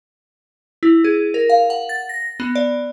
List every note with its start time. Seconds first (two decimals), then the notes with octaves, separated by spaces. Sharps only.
0.83 E4
1.04 G#4
1.34 A#4
1.49 F5
1.70 F#5
1.89 A6
2.09 A#6
2.40 B3
2.55 D5